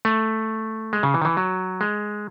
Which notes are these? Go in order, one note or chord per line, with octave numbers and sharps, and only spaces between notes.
A3
G#3
C#3
E3
D#3
E3
F#3
G#3